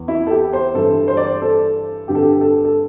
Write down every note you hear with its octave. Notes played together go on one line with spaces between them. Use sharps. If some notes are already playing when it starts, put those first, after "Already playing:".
Already playing: E2 E3
E4
A4
G4
C5
G2 E3 A4
C5
D5
C5
A4
G2 D3 G4
A4
G4
A4
A4